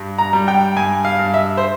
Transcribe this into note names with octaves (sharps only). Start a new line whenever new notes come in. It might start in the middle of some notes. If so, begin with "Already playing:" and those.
Already playing: G2
A#5
G3
G5
G2 G#5
F5
G2
E5
C5